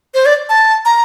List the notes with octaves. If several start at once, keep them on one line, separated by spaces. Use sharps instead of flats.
C5
D5
A5
A#5